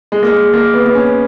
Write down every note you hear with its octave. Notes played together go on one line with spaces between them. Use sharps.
G#3
A#3
G#3
A#3
B3
B3
C#4